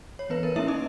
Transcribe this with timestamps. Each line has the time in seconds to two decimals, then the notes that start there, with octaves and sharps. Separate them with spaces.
0.19 C#5
0.30 E3 B3 B4
0.43 A#4
0.56 A#3 C#4 E4 E5
0.68 D#4 D#5